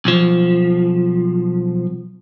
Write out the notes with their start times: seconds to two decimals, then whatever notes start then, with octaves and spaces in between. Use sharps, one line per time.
0.05 B1 F3